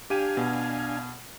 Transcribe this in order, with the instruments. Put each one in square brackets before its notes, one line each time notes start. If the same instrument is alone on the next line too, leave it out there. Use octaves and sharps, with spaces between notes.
[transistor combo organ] D4 F5 G#5 [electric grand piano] G4 D#7
[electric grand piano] B2